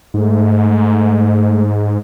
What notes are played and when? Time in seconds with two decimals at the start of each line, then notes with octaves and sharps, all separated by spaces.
0.14 G#2 A3